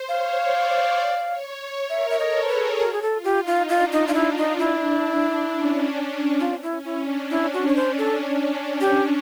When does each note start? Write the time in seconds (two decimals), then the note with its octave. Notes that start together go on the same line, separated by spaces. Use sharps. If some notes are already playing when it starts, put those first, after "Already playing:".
Already playing: C5
0.09 C#5 F5
0.39 D5
0.69 D5
0.99 D5
1.29 C#5
1.89 A#4 E5
2.10 E5
2.19 A4 D#5
2.44 C5
2.49 G#4 B4
2.79 F#4 A#4
2.93 G#4
3.02 A4
3.09 F4
3.24 G4
3.39 D#4
3.47 F4
3.69 D4 F4
3.92 D#4
4.07 F4
4.14 E4
4.37 D#4
4.59 D4 E4
5.50 C#4
6.40 C4 F4
6.63 E4
6.71 C#4
6.85 E4
7.00 D4
7.30 C#4 E4
7.53 F#4
7.68 C#5
7.75 C#4 C5
7.98 A4
8.81 G4